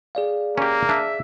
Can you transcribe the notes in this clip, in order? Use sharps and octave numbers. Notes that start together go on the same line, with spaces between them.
G#4 D5 F5
A#3 C#4 G4
D4 E5